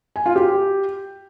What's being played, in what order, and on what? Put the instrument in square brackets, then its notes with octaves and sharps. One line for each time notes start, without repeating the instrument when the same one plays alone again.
[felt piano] G#5
F4
G4